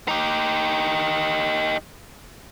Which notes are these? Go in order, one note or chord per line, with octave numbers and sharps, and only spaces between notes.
D#4 G4